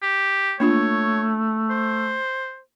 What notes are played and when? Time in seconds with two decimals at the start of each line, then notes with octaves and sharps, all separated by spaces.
0.02 G4
0.60 A3 A#3 D4 F4 C#5
1.70 C5